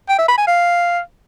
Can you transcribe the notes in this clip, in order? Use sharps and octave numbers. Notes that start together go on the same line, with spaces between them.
G5
E5
B5
G#5
F5